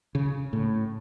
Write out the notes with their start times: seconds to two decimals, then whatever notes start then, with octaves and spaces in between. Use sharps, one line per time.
0.15 C#3
0.53 A2